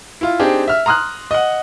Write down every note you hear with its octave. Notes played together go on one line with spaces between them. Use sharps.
E4 F4
C4 D4 D#4 G4 G#4
E5 F6
A#5 C6 D#6 F6 F#6
D#5 F#5